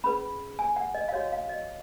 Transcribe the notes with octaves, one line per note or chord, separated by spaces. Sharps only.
C#4 G#4 B4 B5
G#5
F#5
D#5
F5
F#4 C#5 D#5
F5
D#5